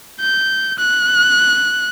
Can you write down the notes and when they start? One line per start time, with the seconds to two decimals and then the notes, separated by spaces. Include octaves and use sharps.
0.20 G6
0.79 F#6